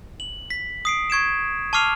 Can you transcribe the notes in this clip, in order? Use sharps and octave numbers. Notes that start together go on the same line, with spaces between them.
F#7
B6
D#6 C7 D7
C#6 G#6 D7 E7
A5 C#6 D6 F6 C7 F7